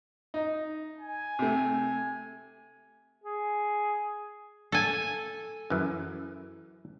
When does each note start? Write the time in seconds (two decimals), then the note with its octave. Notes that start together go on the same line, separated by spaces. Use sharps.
0.34 D#4
0.98 G#5
1.39 C3 A3
3.24 G#4
4.72 A4 G#5
5.70 F#2 E3